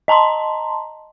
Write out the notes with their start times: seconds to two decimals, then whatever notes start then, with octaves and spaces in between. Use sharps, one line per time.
0.08 D#5 A5 A#5 C6